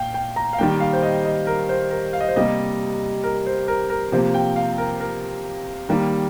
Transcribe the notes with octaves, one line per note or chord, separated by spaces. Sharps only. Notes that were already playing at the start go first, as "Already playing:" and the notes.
Already playing: A#2 F5 G5
G5
A#5
F5
D#3 G3 A#3 G5
F5
C5
D#5
D#5
A#4
C5
A#4
F5
D#5
C5
C3 G3 A#3 D#5
A#4
C5
A#4
A#4
C3 F3 A#3 C5
G5
F5
A#4
A#4
D#3 G3 A#3